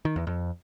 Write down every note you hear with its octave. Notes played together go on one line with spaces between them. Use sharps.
D#3
E2
F2